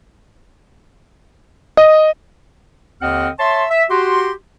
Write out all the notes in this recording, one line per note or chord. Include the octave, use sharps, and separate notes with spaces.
D#5
D#2 D3 C4 D#5 F#5 F6
C#5 E5 A5 C6
E5
F#4 G4 C6